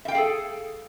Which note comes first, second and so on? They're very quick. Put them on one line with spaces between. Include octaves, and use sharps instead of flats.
E5 G5 F5 G#4 A4